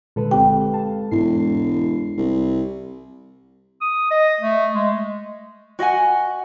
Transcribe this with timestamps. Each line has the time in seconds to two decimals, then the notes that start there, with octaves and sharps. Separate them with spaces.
0.16 A#2 D3 G#3 A4 B4
0.31 G1 C4 G4 G5
0.72 F5 A5
1.11 E1 G#2 E4 C7
2.17 C2
3.81 D#6
4.11 D#5
4.41 A3
4.74 G#3
5.79 F#4 D#5 F#5 G#5